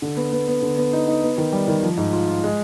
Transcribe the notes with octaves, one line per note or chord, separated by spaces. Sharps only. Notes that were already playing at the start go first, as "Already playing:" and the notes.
D3
B3
B3
B3
D3
B3
D#4
D#4
B3
D#3
G3
D#3
F3
G#2
F4
F4
G#3